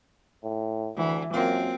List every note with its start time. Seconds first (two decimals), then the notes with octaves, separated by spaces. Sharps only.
0.44 A2
0.97 D2 E3
1.34 F#2 F#3 A#3 C4 F4